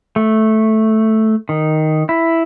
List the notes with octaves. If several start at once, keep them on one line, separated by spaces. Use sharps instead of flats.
A3
D#3
E4